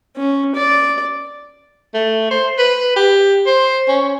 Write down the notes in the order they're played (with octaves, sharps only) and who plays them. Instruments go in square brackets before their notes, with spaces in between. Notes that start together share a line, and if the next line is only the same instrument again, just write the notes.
[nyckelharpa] C#4
D5
[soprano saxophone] A3
C5
B4
G4
C5
C#4